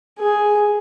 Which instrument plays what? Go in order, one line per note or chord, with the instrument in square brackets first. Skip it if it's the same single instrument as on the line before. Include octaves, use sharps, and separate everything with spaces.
[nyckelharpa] G#4